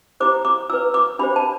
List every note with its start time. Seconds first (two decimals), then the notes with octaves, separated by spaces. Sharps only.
0.20 E4 G4 C5 D6
0.45 D6
0.69 E4 B4 E6
0.94 D6
1.19 D4 G4 C5 B5
1.36 A5